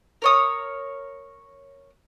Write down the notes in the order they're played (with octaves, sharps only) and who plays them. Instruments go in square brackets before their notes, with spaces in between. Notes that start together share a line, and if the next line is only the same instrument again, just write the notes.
[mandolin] A#4 C#5 D#6